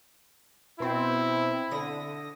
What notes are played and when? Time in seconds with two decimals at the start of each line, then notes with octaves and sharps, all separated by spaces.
0.80 B2 C4 E4
1.71 D3 D#6 A#6